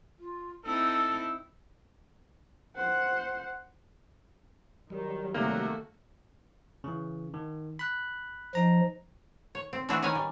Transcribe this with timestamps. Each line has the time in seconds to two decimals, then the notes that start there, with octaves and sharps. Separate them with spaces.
0.19 F4
0.65 C4 D#4 E4 A4 E6
2.76 C5 F#5
4.90 D#3 F#3 G3
5.34 C3 D#3 A3 A#3 F#4
6.84 C#3 E3
7.34 D#3
7.79 B5 F#6
8.55 F3 D#4 A#5
9.55 C#5
9.73 C4
9.89 E3 A3 C4 D4 E4 F#4
10.02 D#3 C#4 A#4 B4 G#5
10.15 G3